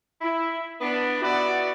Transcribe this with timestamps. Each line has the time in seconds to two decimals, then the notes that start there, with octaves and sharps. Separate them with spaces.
0.22 E4
0.80 B3 D4
1.22 B3 E4 F#4 D5